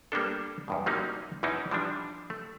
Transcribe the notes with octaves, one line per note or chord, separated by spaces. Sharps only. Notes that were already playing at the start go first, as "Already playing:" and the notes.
G3 A#3 B3 D4 A4
E2 G2 B2
F#3 G3 A#3 C4 C#4 D#4
E2 E3 C#4 D#4 E4
E3 F3 G3 D4
A3